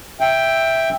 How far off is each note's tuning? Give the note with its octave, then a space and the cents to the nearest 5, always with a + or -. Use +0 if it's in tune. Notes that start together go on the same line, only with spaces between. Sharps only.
E5 +0 G5 +5